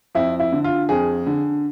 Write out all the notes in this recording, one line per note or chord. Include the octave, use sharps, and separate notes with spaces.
F2 E4
E4
D3
F4
F2 G#4
D3